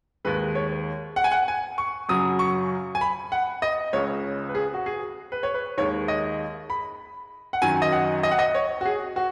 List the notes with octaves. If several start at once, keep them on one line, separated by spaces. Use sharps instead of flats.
D#2 D#3 G#3 B4
C#5
F#5
G#5
F#5
G#5
C#6
F#2 C#3 F#3 D#6
C#6
G#5
B5
F#5
D#5
C#2 C#3 G#3 C#5
B4
G#4
F#4
G#4
B4
C#5
B4
D#2 D#3 G#3 C#5
D#5
B5
F#5
F#2 D#3 F#3 G#5
D#5
F#5
D#5
F#5
D#5
C#5
F#4
G#4
F#4